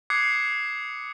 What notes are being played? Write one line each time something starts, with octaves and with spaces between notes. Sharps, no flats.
D6 D#6 F#6 G#6 C7 C#7